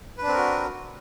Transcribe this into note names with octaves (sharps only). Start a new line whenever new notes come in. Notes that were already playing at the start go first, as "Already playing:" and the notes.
C4 D4 F#4 A#4 B4